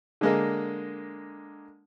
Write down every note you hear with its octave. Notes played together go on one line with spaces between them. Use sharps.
D3 G#3 A#3